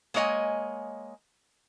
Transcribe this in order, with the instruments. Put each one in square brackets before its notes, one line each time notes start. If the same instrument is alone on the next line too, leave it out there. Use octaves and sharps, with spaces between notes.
[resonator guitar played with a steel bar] G#3 A#3 C#5 D#5 G#5